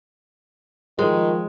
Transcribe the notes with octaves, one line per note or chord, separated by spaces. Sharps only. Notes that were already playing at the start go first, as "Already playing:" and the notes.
D#3 F3 G#3